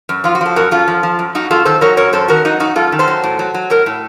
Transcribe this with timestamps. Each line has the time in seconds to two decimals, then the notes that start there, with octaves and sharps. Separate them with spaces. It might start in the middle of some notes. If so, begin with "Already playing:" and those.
0.09 F#2
0.24 F3 F4
0.35 F#4
0.41 F3 A4
0.56 F#2 F#4 A#4
0.71 F#2 F4 A4
0.88 F3
1.03 F3
1.19 F#2
1.35 F#2 D#4 F#4
1.51 F#2 F4 A4
1.65 D#3 A4 C5
1.81 F#3 A#4 C#5
1.97 F#2 A#4 C#5
2.13 F#2 A4 C5
2.28 D#3 F#4 A#4
2.45 F#3 D#4 F#4
2.60 F#2 D#4 F#4
2.76 F#2 F4 A4
2.92 D#3
2.99 A4 C5
3.08 F#3
3.23 A2
3.39 F#3
3.54 F#3
3.70 A2 A#4 C#5
3.86 A2